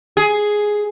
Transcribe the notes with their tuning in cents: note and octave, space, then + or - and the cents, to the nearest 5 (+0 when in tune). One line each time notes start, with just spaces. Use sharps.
G#4 +5